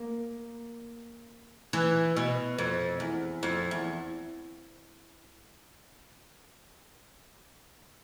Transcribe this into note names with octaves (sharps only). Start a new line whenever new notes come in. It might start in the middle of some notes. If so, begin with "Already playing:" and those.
Already playing: A#3
E3
B2
F2
E2
F2
E2